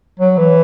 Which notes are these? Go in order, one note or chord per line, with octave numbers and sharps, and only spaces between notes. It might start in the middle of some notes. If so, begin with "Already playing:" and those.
F#3
E3